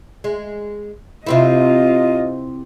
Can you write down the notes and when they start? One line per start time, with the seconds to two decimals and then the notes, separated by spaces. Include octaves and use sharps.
0.24 G#3
1.26 C3 C4 E4 F4 D#5